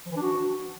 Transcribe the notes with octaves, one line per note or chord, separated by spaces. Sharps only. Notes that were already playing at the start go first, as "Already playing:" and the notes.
F3
E3
D4
F#4